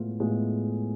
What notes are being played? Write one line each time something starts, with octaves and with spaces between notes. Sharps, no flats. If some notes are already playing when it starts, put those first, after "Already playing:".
Already playing: A2 G#3 B3 F4
A2 G#3 B3 F4